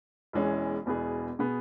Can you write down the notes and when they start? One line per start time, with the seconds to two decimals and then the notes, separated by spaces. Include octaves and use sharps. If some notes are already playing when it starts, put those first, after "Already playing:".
0.33 E1 E2 E3 G#3 C#4
0.86 E1 E2 B2 B3 G#4
1.39 B2 B3 G#4